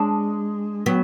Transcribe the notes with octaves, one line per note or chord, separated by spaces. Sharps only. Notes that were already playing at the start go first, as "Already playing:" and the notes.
Already playing: G#3 D4
F#3 B3